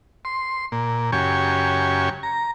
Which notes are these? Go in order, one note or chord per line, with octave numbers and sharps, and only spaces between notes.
C6
A#2
F#2 C#3 G4 G#5 C#6
A#5